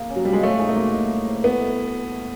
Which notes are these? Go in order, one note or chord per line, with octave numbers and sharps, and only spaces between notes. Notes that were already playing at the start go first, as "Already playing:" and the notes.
Already playing: A#3 G#4 F5
C#4
F#3
F3 G3
G#3
A3 C#5
G#3 D#4
A3
A#3 F#4
E4
G#4
C5
A3 B3
A3